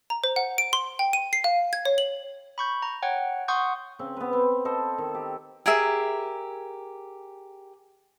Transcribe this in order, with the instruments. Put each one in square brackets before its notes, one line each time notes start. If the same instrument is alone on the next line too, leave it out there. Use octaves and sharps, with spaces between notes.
[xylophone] A#5
C5
F#5
D7
C6
G5
D#7
C7
F5
G#6
C#5
F#7
[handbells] B5 C#6 G6
A#5
C#5 F#5 G5
F#5 C6 C#6 D#6 G6
[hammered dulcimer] C#3 C4
B3 B4
C4
A4 C5 D#5
D#3
G4
[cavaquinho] G4 G#4 A#4 E5